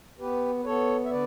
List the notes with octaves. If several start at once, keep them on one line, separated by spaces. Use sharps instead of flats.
B3 G4 B4
B4
B3 A4 C#5
E5
D3 B4 D5